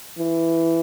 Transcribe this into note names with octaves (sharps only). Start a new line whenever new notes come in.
E3